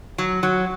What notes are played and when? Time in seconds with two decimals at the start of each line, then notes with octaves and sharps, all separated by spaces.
0.18 F#3
0.43 F#3